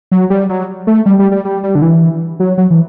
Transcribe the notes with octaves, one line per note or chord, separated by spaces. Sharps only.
F#3
G3
F#3
A3
G3
G3
G3
G3
G3
D3
E3
F#3
F#3
E3